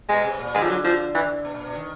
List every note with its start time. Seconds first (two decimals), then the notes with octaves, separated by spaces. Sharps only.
0.09 B2 G#3
0.25 C3
0.39 A#2
0.55 D3 G#3
0.62 F3
0.69 F#3
0.85 F3
1.15 E3
1.45 B2
1.54 A#2
1.65 B2
1.75 D#3